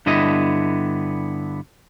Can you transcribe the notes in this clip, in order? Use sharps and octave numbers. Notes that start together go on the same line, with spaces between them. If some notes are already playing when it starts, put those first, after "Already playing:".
G2 D3 B3 E4 D#5